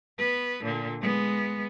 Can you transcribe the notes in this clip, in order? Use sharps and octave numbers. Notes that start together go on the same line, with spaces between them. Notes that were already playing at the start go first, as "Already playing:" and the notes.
B3 B4
A#2 D3
G#3 B3